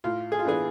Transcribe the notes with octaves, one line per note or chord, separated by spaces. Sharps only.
A2 F4
G#4
F4
E3 B3 D4 G#4